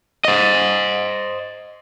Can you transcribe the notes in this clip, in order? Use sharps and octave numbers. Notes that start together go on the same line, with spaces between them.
C5 D#5